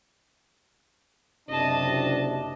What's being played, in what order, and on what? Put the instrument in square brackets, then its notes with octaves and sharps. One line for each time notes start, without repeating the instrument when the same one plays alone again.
[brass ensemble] F#1 C3 D4 [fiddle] D#5 A5